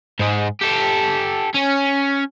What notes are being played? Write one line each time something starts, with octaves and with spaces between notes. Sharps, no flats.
G#2 G#3
G4 A4
C#4